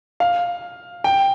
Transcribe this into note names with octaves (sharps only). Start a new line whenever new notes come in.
F5
G5